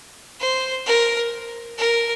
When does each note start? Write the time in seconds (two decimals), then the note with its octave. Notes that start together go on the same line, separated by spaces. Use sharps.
0.40 C5
0.86 A#4
1.78 A#4